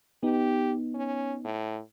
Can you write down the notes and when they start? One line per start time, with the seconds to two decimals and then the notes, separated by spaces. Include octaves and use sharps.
0.23 B3 D#4 G4
0.94 C#4
1.45 A2